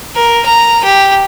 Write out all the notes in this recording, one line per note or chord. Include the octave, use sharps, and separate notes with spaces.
A#4
A#5
G4